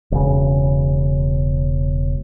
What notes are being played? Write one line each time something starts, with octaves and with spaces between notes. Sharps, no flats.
E1 C#3